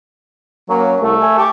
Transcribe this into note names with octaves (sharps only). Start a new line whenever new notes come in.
F#3 A#3 C#4
C2 A3
E5 G#5
G4 A5 C#6